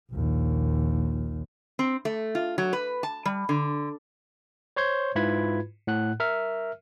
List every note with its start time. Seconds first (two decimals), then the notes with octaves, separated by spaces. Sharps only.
0.12 A#1 D#2
1.79 C4
2.05 A3
2.35 F4
2.58 F#3
2.73 B4
3.03 A5
3.26 G3
3.49 D3
4.76 C5 C#5 C6 G6 G#6
5.15 G#2 E4 F4 B4 B5 G#6
5.87 A2 F#5 F#6
6.20 A#4 E5 F6